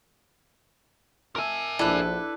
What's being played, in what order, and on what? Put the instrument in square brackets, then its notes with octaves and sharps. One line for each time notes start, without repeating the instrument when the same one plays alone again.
[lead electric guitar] A#4 G#5 [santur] E5 A5
[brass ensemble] A#1 [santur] D4 E4 [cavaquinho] A4 B4